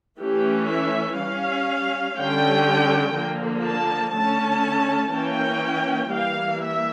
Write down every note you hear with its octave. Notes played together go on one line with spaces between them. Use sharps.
E3 A3 C#4 G4
E5
G3 C#4 F5
D3 G3 C#4 G5
D3 F3 A#3
A5
D3 A3 C#4 A5
E3 A#3 C#4 G5
E3 G3 A#3 F5
E5